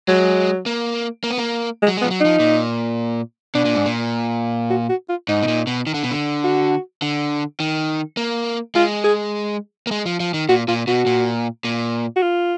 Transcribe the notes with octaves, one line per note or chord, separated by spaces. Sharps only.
F#3 G#3
A#3
A#3
B3
A#3
G#3
F#3
G#3 B3
F3
F#3
F3 D#4
A#2
B2 D4
A#2
G#2
A#2
F#4
F#4
F4
G#2 D#4
B2
A#2
B2
D#3
D3
B2
D3
F#4
D3
D#3
A#3
G#3 F4
G#4
A#3
G#3
F3
F3
D#3
A#2 F#4
A#2 F4
B2 F#4
A#2
A#2
F#4
F4